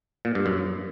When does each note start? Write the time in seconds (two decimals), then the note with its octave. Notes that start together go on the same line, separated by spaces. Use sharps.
0.25 A#2
0.35 G2
0.46 F#2